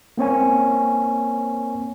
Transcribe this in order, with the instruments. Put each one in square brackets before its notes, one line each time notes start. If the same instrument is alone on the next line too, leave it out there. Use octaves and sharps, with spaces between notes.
[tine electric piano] A#3 C4 C#5 G#5